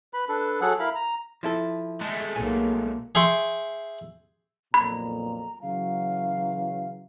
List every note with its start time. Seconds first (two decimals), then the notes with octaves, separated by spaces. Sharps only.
0.14 B4 B5
0.29 D4 A4 B4
0.61 F#3 G#4 A4 F#5
0.79 E4 A#4 F5 B5
0.95 A#5
1.43 F3 E4 A4
2.01 G#3 A3
2.36 B1 A#3 G#5
3.15 G#4 E5 G5 C6 C#6
4.74 B1 F2 A#2 A#5 B5
5.62 C#3 E3 F#3 F5